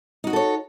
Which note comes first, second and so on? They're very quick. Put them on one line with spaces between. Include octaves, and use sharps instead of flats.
D#4 F#4 D#5 A4 C#5